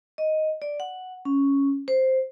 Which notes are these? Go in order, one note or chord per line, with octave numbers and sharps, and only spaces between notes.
D#5
D5
F#5
C#4
C5